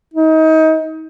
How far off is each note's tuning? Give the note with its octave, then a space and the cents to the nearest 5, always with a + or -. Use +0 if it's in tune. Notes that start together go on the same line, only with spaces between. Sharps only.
D#4 +30